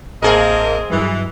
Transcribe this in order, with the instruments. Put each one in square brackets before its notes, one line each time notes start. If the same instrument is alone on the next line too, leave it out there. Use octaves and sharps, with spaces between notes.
[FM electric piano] A1 E5 A5 [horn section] A#3 C4 D#5 [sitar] G#4 A#4
[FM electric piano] G2 F#3 G3 [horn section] E3